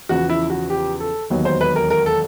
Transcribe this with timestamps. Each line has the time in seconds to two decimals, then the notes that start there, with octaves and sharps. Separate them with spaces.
0.09 E2 C#3 F3 F#4
0.29 E4
0.50 F#4
0.70 G4
1.00 A4
1.30 E1 D#2 D#3 F#3 B3
1.45 C5
1.61 B4
1.76 A#4
1.90 A#4
2.06 A4